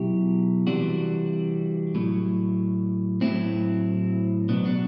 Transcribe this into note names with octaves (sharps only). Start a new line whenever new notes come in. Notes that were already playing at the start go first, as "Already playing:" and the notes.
Already playing: B2 F#3 E4 G4
C3 E3 G3 D4 F#4
A2 F#3
A2 F#3 C4 E4
B2 F#3 B3 D4
D4 F#4